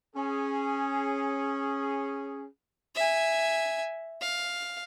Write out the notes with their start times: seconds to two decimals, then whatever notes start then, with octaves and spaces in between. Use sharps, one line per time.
0.16 C#4 G#4
2.95 E5 G#5
4.21 F5